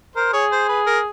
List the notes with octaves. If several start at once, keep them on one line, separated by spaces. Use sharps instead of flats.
A#4 C5
G#4 C#5
C5
B4
A#4